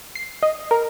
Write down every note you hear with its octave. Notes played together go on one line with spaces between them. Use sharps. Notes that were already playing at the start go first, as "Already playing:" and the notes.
C7
D#5
A#4